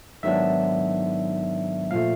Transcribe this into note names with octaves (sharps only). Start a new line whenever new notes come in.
G#2 D#3 F#3 B3 D4 E5
A#2 F3 A3 F5